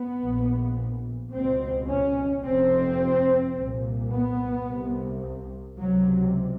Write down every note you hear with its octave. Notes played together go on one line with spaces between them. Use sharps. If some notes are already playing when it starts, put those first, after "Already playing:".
Already playing: B3
A#1 A#2
C#2 B2 C4
C#4
F1 F2 C3 C4
C2 A#2
B3
C2 C3
C#2 C3 F#3